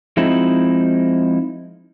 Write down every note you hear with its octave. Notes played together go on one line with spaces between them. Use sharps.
F3 G#3 C4 D#4 E4